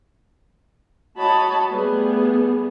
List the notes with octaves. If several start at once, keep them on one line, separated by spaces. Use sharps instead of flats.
F#4 C#5 D#5 A5 B5
G3 A3 B3 G#4